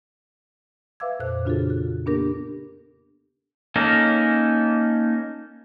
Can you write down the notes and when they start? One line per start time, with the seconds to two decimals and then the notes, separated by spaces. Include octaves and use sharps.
1.00 B4 E5 F5 D6 E6 G#6
1.19 F2 A#2 A4 C5 F#6
1.45 C#3 D4 F4 F#4 G#4 A4
1.70 F#6
2.06 A#3 B3 D4 G4 A4 A#4
3.76 A#3 C#4 D#4 A4